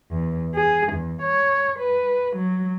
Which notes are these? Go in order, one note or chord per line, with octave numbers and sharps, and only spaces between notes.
E2
G#4
E2
C#5
B4
F#3